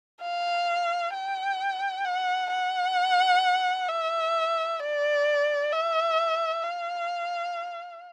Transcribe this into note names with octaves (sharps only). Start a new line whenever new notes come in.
F5
G5
F#5
F#5
E5
D5
E5
F5